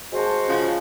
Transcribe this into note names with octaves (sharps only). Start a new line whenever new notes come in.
G#3 F#4 C5 A5
C#3 F3